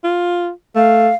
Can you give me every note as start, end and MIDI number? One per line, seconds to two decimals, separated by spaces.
0.04 0.51 65
0.76 1.10 57
0.76 1.15 77